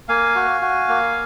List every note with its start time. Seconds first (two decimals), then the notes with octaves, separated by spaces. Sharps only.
0.08 A#3 F5 G#5
0.35 F#4
0.62 F#4
0.89 A#3